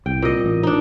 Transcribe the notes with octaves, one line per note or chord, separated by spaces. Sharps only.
C2 G5
A#2 D#5
A1
D4 D#4